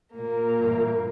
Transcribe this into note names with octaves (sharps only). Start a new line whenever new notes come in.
A#2 A#3
G2 E3